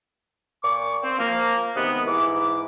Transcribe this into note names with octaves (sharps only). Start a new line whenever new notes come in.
A#2 C#6 D6
C4
F3 A#3
C3 D#3 G#3 B3
G#2 E3 D6